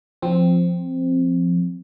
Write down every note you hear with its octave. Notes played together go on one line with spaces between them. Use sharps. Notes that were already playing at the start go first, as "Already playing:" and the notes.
F3 C4